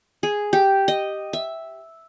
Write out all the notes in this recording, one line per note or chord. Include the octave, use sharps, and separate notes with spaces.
G#4
G4
D#5
E5